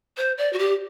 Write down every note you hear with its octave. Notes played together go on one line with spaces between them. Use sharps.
C5
D5
F#4
G4